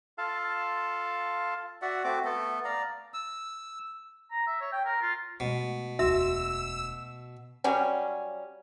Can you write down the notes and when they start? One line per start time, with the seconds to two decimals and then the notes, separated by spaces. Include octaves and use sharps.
0.18 F4 A4 F5 A5
1.82 F#4 D5 E5 F#5
2.04 A3 C4 F#4 D6
2.24 A3 B3 A4
2.65 D5 F5 A#5
3.14 E6
4.31 A#5
4.47 E5
4.61 C#5
4.73 G5
4.85 A#4
5.02 F4
5.40 B2 G#3 A3
5.99 E1 D2 F#4 E5 E6
7.64 F#3 G3 C#4